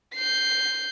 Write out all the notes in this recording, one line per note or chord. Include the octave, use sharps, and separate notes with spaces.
G6 C7